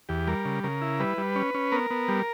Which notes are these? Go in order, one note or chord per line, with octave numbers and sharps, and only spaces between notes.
E2 G4
G3 A#4
C#3
C#3 A#4
E4
G3 B4
G3
C#4
C#4
B3 A#4
B3
G3